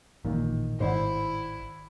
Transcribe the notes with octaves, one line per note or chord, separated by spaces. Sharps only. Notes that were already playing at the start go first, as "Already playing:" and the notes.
A1 A#2 D#3 E3 A#3
G#1 A2 D#3 E4 C5 D5 F#5